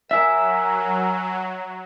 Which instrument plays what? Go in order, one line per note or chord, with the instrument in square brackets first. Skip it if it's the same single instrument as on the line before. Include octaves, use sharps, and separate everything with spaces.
[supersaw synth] F#3 [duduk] A#4 [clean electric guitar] E5 [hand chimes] G#5 E6